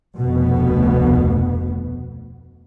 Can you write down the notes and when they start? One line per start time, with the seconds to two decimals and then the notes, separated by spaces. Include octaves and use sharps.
0.19 F1 D2 B2 B3